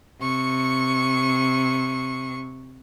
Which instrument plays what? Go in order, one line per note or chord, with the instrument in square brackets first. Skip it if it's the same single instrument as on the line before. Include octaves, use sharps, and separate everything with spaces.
[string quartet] C3 C#6